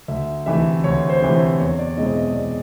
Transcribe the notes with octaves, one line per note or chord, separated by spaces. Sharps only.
D2 E5
C3 E3 A3 E5
D2 C#5
C5
C3 E3 A3
C5
E2 C#5
D5
B2 G#3 C4 E4 D#5
D#5
E2 D5